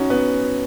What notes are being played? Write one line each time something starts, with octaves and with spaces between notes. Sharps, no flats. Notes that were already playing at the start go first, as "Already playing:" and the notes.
Already playing: C#4 D#4 F#4
B3